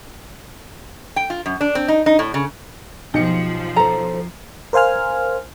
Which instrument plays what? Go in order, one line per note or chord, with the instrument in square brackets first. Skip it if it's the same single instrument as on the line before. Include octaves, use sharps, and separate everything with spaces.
[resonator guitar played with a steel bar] G5
F4
F#2
D4
C4
D#4
D#4
A2
C#3
[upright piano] B1 C#7 [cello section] F3 [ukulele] G4 D#5
[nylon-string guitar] A4 C5 [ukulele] A#5
[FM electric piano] A#4 C5 F5 G#5 F6